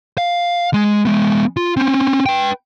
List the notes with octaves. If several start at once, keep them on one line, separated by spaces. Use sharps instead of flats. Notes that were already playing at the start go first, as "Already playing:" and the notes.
F5
G#3
G#3 B3
F4
C4 C#4
B4 G5